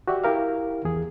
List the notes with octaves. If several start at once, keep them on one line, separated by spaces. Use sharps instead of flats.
F#4 G4 D5 E5
E4 G4 A#4 F5
E2 G#4